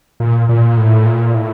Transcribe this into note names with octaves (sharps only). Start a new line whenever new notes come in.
A#2
A#2
A2
A#2
A2